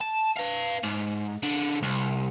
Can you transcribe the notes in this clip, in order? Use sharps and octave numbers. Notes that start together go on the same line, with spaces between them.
A5
B4 F5
G#2
C#3 D4
C2